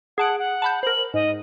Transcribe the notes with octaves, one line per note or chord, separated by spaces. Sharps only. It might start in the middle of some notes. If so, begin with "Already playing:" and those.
G#4 F#5 A5 D7
F#5
A5 B5 G6
A#4 C5 F#7
G#2 D#5